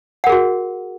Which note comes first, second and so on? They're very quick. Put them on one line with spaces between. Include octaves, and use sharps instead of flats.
F#5 A#4 G#4 F#4